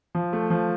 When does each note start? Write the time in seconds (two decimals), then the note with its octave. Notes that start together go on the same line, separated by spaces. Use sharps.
0.15 F3
0.33 A3
0.50 F3